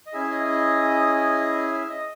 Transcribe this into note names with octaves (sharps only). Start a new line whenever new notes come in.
D#5
C#4 E4 G#4 E5
D#5
D#5
E5
D#5